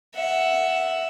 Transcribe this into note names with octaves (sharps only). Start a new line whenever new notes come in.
E5 F#5